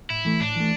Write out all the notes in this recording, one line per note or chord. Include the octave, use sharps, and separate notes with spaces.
A2 E4
E3 A3
A2 D4
E3 A3